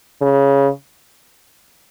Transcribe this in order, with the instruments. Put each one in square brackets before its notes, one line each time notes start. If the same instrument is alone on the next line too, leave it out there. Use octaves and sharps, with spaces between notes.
[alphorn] C#3